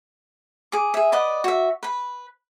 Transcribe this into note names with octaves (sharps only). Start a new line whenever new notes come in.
G#4 D6
G#4 E5
B4 D5 D#5 F#5
F#4 E5
B4 B5